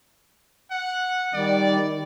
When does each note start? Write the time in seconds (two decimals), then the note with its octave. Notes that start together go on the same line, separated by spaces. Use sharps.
0.71 F#5
1.34 D#3 G3 D5